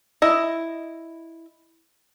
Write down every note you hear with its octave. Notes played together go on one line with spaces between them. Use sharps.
E4 D#5